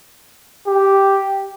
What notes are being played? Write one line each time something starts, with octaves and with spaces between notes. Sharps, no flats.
G4